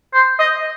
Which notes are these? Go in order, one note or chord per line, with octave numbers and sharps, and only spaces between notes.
C5
D#5